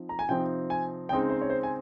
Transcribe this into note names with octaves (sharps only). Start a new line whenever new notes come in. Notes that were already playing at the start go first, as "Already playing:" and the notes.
Already playing: F3 C4 D#4
A#5
G#5
C3 F3 C4 D#4 G5
G#5
C#3 G#3 C4 D#4 G5
C5
C#5
C5
G#5